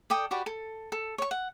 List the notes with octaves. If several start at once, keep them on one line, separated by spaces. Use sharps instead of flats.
A4 D5 G5 D#6
F#4 G4 B4 D5
A4
A4
C#5 C#6
F#5